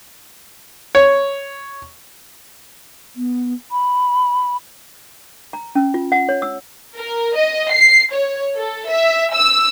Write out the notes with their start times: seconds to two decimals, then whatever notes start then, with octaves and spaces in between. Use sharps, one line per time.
0.95 C#5
3.16 B3
3.71 B5
5.53 A#5
5.75 C#4
5.94 F4
6.12 F#5
6.29 C#5
6.42 E6
6.96 A#4
7.35 D#5
7.72 C7
8.13 C#5
8.56 A4
8.89 E5
9.34 E6